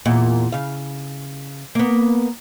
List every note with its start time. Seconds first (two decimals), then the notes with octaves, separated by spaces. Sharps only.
0.06 E2 A#2
0.52 C#3 F5
1.75 A#3 B3